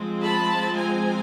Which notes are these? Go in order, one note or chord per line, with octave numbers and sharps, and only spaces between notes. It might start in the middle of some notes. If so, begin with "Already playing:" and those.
Already playing: F3 G#3 C4
A5 B5
G#5 A#5